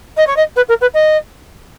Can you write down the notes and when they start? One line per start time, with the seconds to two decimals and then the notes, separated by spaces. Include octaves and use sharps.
0.17 D#5
0.27 C#5
0.36 D#5
0.56 B4
0.68 A#4
0.81 B4
0.94 D#5